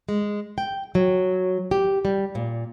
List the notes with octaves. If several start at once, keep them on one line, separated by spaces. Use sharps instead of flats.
G#3
G5
F#3
G4
G3
A#2